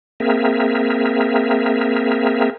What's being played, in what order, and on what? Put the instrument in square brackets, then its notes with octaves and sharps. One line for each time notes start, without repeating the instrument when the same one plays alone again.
[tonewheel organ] A#3 C4 G#4 A#4 E5